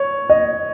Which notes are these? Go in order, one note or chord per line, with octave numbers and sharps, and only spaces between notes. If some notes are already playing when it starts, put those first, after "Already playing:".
Already playing: C#5
D#5